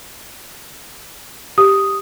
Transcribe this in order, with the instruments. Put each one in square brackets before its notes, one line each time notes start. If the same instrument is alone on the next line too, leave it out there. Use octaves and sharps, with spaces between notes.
[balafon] G4 [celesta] D#6